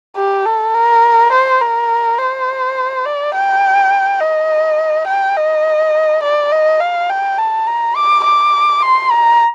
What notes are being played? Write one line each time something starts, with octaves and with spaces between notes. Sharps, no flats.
G4
A4
A#4
C5
A#4
C5
D5
G5
D#5
G5
D#5
D5
D#5
F5
G5
A5
A#5
D6
D6
C6
A#5